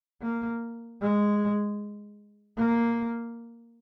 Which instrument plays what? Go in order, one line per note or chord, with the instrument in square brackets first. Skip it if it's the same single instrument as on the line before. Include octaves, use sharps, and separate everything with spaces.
[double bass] A#3
G#3
A#3